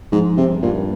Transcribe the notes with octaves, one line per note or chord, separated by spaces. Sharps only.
G#2 F3
G2 C3
G2 A#2